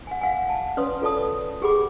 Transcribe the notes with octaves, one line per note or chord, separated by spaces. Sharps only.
F#5 G#5
F5 F#5 G#5
A5
C#4 B4 C#5 D5 C6 D#6
F4 A4 D5 A5 D#6
G4 G#4 F#5 G5 B5 D6